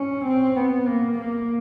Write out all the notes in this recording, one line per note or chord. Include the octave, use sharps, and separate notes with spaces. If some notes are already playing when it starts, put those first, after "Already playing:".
Already playing: C#4
C4
B3
A#3
A#3